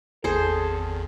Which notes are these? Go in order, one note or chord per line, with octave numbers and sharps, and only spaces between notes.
G#1 E2 G#4 A4 C5